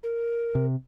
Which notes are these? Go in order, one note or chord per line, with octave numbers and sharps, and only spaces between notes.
A#4
C3